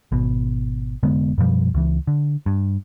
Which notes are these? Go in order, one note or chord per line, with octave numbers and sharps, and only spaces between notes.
G#1 B2
F1 D3 G#3 B3
F#2 B2 F3 G3
C#2 E3
D3
G2